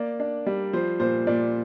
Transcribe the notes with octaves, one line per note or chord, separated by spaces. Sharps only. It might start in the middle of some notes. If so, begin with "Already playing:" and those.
Already playing: A#3 D5
D4
G3
F3 C5
A#2 C5
A#2 D5